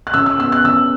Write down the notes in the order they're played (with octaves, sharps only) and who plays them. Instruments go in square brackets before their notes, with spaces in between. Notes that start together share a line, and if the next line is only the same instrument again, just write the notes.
[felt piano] F#6
C#3 E6
E6
B3 E6
F#6
C#3 E6